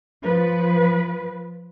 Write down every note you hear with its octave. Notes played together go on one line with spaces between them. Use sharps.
F3 B4